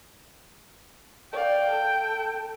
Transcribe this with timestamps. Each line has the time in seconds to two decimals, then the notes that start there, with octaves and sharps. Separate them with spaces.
1.33 D5 F5 G5
1.71 A4